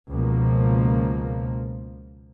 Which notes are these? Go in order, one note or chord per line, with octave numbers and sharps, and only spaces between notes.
C#2 B2 F3 A#3